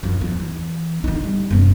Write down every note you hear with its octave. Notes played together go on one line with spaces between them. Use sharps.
F#2 F3
E2
E3
D3 D#4
G3
F#1 C3